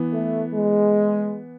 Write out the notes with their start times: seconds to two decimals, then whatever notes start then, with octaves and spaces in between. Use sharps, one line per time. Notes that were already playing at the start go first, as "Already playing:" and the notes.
Already playing: E3 B3
0.13 A3
0.54 G#3